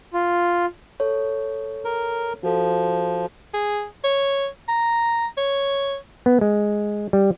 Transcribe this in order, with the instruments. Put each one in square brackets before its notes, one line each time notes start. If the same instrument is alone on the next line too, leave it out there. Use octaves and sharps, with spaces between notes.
[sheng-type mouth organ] F4
[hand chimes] A4 C#5
[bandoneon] A#4
[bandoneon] F3 [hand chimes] F#4 A4
[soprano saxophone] G#4
C#5
A#5
C#5
[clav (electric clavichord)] B3
G#3
G3